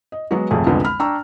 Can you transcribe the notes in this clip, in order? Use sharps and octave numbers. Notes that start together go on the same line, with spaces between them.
D#5
F#3 G#3 B3 F#4
G#1 F2 C3 A3 G#4
C2 F2 D3 F3 G#3 B3
B5 F6
D4 G5 A#5 C#6 E6